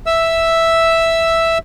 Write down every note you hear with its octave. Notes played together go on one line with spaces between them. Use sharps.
E5 E6